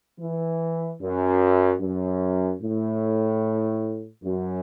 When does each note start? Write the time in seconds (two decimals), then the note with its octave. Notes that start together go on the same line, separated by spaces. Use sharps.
0.19 E3
1.01 F#2
1.81 F#2
2.62 A2
4.23 F#2